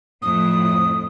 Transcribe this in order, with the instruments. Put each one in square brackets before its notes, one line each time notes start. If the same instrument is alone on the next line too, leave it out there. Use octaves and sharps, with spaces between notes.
[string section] F2 A2 [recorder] D#6